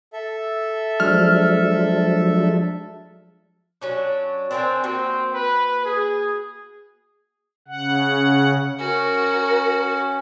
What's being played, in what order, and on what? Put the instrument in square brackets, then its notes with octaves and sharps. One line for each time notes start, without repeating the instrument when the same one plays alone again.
[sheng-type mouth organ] A4 E5
[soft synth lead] F3 [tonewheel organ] F#3 G#3 D4 [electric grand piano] F6
[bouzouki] F#3 C#4 D4
[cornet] C4 [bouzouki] D4 A#4 G#5
[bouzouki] A#3 F#4 [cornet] C4
[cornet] B4
G#4
[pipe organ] C#3 F#5
[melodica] C#4 [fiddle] F#4 [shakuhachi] A#4